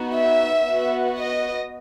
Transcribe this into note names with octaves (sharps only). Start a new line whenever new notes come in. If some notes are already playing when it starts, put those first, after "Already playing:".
Already playing: B3 D#4 F#4
E5
B3 F#4
D#5